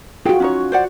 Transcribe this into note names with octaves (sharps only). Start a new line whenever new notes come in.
F4 F#4 G#4 G5
C#4 D#4 C#5
C5 D5 F#5